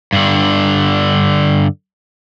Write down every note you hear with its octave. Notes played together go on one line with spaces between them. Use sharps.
G2 D3